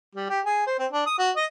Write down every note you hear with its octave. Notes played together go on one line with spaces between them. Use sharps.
G3
G4
G#4
C5
C4
D4
D#6
F#4
D#5